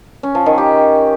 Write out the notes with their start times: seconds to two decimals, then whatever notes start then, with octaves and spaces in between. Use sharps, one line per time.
0.23 C#4
0.35 F3
0.46 D#3
0.58 G4